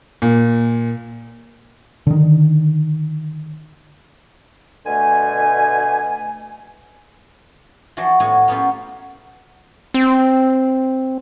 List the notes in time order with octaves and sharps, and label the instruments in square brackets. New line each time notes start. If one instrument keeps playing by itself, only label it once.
[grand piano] A#2
[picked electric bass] D3 D#3
[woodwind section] B2 D3 A3 G#5
[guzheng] E3 F3 F#4 D5
A2 B3 F#4 G#5
A#3 B3 C#4 F4 G4
[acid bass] C4